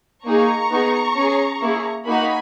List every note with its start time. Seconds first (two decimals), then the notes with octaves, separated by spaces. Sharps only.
0.24 A#3 D#4 G#4 A#5 C#6
0.70 B3 D#4 G#4
1.15 C#4 G#4
1.60 A#3 E4 G#4
2.05 A#3 D#4 F#4 G#5 B5